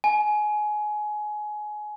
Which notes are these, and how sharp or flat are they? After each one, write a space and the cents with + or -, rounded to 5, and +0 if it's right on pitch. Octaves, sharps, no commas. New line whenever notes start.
G#5 +20